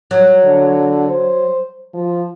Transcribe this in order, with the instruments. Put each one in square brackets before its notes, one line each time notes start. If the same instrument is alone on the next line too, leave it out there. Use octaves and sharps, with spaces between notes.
[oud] F#3
[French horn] D3
C5
F3